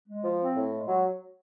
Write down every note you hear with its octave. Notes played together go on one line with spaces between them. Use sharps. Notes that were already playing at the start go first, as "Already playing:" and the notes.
G#3
F3
C4
A2
G#3
F#3